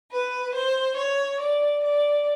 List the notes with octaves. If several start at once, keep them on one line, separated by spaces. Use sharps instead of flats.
B4
C5
C#5
D5
D5